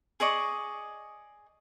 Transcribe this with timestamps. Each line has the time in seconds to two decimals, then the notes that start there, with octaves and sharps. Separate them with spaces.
0.20 G#4 D5 D#5 C#6